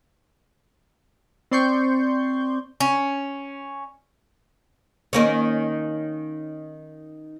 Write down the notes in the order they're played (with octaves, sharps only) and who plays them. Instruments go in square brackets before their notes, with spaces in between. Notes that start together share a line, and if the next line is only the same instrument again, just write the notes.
[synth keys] C4 D5 C6 C#6 G6
[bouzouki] C#4
[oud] D#3 A#3 C#4